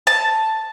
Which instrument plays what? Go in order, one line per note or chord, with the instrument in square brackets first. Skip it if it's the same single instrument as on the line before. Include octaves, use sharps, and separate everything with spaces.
[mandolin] A5